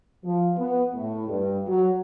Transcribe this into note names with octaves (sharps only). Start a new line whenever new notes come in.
F3
B3
A2
G2
F#3